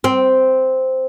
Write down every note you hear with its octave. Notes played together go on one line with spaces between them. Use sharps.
C4